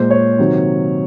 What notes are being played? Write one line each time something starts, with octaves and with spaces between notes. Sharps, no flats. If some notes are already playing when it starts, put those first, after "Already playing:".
Already playing: A#2 G#3 C5
C#5
C3 D#3 F#3